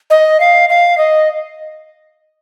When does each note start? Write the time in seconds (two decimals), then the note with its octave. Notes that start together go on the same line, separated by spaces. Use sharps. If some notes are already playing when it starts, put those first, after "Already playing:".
0.10 D#5
0.40 F5
0.69 F5
0.98 D#5